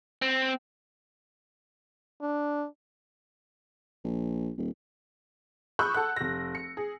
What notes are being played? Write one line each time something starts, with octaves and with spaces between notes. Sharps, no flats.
C4
D4
A#1
D#1
B5 C#6 D#6 E6 F#6 G6
A4 F#5 F#6
F1 A#6
C#7
G#4